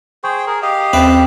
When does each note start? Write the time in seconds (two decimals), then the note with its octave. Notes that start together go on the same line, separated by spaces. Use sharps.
0.24 G#4 C5 G5 C#6
0.47 G#4 A#4
0.62 G4 D#5 F5
0.93 D#2 C4 B4